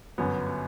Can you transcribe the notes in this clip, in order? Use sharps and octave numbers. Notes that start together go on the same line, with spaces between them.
G1 F#2 F#3 B3